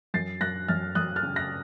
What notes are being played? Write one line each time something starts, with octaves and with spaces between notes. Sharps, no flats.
F#2 A6 C7
F#2 F#6 A#6
F#2 F6 A6
F#2 D#6 F#6
F6 A6
C#3
F#6 A#6